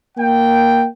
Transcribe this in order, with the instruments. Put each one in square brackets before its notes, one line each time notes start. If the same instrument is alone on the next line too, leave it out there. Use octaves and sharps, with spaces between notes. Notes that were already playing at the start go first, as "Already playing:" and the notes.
[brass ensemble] A#3 G5